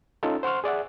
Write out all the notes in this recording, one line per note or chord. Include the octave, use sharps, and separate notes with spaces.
C#4 D#4 F4 A4
C5 F#5 C6 C#6 F6
G#4 D5 E5 F#5